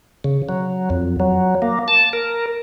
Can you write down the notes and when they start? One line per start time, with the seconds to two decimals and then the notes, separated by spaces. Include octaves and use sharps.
0.24 C#3
0.49 F#3
0.90 F2
1.20 F#3
1.62 A#3
1.88 A5
2.13 A#4